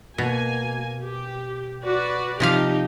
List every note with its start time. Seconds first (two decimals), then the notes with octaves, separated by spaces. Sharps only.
0.18 B2 A#3 G#5
1.02 G4
1.86 F#4 B4 D5
2.40 C3 F3 D#4 G4 F5